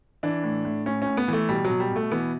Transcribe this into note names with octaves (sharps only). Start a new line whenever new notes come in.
E3 D4
A2
A2
A2 C#4
A2 C#4
B3
E3 A3
B2 G3
F#3
B2
G3
B2
A3
E3 B3